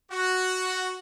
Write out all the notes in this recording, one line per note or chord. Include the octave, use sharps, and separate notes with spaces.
F#4